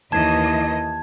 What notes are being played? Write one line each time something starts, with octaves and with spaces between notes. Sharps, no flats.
D#2 E3 D#5 A5 G#6